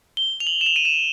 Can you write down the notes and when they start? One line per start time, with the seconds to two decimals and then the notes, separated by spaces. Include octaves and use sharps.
0.17 G7
0.40 F7
0.47 F#7
0.61 E7
0.66 F7
0.76 D#7
0.85 E7